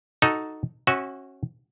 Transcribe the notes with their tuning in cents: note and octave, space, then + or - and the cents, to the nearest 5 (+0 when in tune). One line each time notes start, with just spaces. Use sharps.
D#4 +0 F#4 +0 A4 +0
C#4 -30 F#4 +0 E5 -30